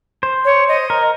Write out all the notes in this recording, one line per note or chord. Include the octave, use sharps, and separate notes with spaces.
C5
C#5
D#5
A#4